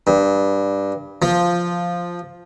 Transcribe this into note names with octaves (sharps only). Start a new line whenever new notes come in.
G2
F3